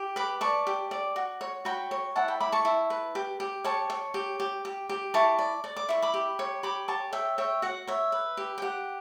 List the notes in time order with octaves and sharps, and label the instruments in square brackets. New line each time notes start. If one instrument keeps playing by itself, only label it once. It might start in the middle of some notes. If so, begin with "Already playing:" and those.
Already playing: [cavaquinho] G4
B4 B5 D6
D5 A5 C#6
G4
D5
F#4
C#5
F#4 G5 B5
C#5
E4 F#5 A5
G5 B5
E4 B5 D6
A5 C#6
E4
B4
G4
G4
C#5 A5 C#6
C#5
G4
G4
G4
G4
E4 A5 C#6
D5
D5
D6
E4 C#6
B5 D6
G4
C#5
G4 B5 D6
G4 A5 C#6
C#5 E5 G5
C#5 E5 G5
F#4 F#5
C#5 E5
B4
G4
G5
G4 F#5